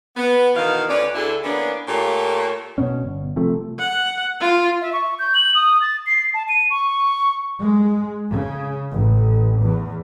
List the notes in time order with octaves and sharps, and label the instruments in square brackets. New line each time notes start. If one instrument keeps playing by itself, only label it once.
[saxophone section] B3
B2 D#3 E3 B3 D#5 F5
D2 C#4 B4 D5
D2 D3 D4 E4 G#4 A4
E3 A#3 B3 C#4 D4
A#2 A3 A#3 F4 G4 C#5
[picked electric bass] B2 C#4
G1
C3 F3 A3
[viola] F#5
F4
[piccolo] E5
C#6
G6
F#7
D#6
A6
C7
A5
D#7
C#6
[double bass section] G#3
C#3
A1
E2